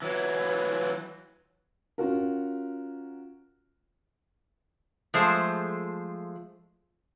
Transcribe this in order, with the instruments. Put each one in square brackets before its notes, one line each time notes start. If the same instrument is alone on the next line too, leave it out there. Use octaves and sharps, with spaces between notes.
[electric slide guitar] E3 F#3
[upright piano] C#4 F4 F#4 A#4
[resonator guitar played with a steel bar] F3 G#3 A3 C5